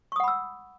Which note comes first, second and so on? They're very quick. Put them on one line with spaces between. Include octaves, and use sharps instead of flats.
C#6 D#6 F#5 B5 E6